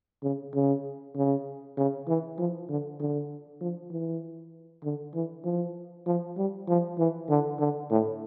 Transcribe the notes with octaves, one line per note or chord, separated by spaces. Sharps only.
C#3
C#3
C#3
C#3
E3
F3
D3
D3
F3
E3
D3
E3
F3
F3
G3
F3
E3
D3
D3
A2